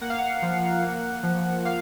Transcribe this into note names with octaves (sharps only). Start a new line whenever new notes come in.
A#3 F#5
F5
F#5
F3
A#3
F3
A#3 F5